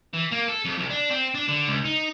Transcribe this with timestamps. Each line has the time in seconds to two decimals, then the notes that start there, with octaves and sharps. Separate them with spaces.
0.13 E3
0.31 A#3
0.48 A4
0.65 F2
0.78 C2
0.90 D4
1.11 C4
1.35 D4
1.49 D3
1.68 C#2
1.85 D#4